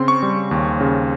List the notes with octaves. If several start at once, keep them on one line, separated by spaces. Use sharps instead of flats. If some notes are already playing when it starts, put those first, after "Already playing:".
Already playing: C#3 C4 C6
C#6
G3
D#2
C#3